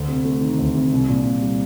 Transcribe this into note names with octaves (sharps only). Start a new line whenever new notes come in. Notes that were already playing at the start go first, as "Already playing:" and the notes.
Already playing: D2 D3
C3
A3
D#3
D2
C3
C2
A#2
C2
G3